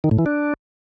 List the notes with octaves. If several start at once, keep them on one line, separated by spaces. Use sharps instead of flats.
D#3
A2
E3
D4